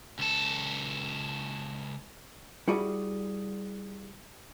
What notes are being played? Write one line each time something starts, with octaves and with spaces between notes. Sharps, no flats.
C#2 A4
G3 E4 F#4 G#4 D5